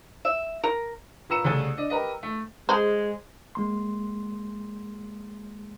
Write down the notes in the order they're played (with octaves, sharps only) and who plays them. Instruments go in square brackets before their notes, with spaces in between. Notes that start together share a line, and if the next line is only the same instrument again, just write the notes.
[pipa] E5
A#4
[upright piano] A#2 B4 A#5 E6 C#7 E7
C2 C#3 A3 A4 G#5 G7
D4 D#5
G4 A#4 B4 D#5
A3
[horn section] G#3 [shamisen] G#4 C5
[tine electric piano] G#3 A#3 C6